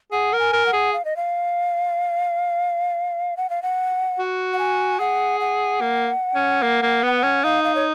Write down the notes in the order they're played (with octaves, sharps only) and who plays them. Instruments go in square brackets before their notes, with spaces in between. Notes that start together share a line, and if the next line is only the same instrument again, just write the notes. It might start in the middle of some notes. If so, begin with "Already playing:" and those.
[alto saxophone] G#4 [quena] F#5
[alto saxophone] A#4
[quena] G#5
[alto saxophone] A#4
[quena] F#5
[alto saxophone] G#4
[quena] F5
D#5
F5
F#5
F5
F#5
[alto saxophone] F#4
[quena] F#5
G#5
[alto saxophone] G#4 [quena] F#5
[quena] F#5
[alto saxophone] A#3
C#4
A#3
A#3
B3
C#4
[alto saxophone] D#4 [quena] F5
[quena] F5
C#5